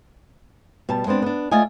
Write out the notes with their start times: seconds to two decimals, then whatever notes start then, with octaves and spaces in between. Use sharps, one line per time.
0.89 B2 G3 A5
1.07 G#3 B3 C4 D4
1.22 B3 D4
1.51 A3 F4 D5 D#5 F5 G#5